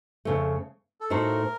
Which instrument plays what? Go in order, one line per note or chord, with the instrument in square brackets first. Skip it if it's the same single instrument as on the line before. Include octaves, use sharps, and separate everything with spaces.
[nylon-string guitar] F2 C#3 A3
[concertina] A4
[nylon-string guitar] A2 A3 D#4 F#4 C5 [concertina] A#4